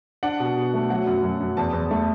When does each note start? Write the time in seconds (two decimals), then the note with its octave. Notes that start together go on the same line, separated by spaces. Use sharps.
0.23 D4 F#5
0.40 B2
0.57 B2
0.74 A3
0.90 F#3 F#5
1.06 F#2
1.23 F#2
1.40 F#2
1.57 E2 A5
1.73 E2
1.91 A3